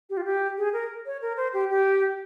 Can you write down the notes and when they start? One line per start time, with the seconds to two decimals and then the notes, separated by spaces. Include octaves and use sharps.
0.10 G4
0.17 F4
0.24 G4
0.58 G#4
0.73 A#4
1.06 C#5
1.22 A#4
1.37 C5
1.54 G4
1.70 G4